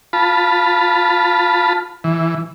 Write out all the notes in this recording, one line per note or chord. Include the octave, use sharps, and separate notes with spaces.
F4 A5 B5
E3